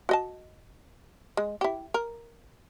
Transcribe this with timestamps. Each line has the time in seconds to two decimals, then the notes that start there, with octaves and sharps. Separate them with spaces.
0.09 F#4 D#5 A5
1.37 G#3
1.61 E4 G4
1.94 A#4